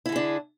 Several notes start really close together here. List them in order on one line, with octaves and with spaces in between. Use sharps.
E4 D3 G#4 D4